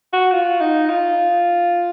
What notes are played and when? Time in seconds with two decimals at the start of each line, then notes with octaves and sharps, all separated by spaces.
0.13 F#4
0.32 F4
0.61 D#4
0.90 F4